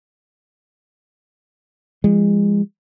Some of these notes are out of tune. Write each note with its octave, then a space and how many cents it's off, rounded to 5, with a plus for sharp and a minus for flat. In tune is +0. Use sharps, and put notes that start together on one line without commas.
F3 -40 G#3 -30